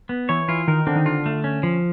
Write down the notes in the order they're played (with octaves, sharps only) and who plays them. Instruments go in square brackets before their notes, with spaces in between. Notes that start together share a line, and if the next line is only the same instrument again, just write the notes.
[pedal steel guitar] B3
[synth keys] E3 [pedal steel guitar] C#5
[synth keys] E3 [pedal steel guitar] F4
[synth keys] D#3 [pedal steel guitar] A#4
[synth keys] D3 [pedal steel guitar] C4
[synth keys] D#3
[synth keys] D3 [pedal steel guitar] F4
[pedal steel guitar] A3
C#4
F3